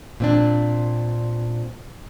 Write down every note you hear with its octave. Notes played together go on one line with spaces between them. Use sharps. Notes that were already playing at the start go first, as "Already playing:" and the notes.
A#2 C4 D4